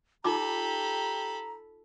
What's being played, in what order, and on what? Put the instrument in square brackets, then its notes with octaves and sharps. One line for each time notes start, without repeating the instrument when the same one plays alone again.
[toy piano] D#4 F4 D6 [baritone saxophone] G4 [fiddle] A4 B5 [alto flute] A#5